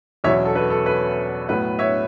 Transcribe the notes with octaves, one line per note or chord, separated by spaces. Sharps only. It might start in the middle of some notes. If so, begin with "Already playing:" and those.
E2 B2 F#3 C#4 C#5 E5
A4
B4
A4
B4
A2 F#3 B3 B4
C#5 E5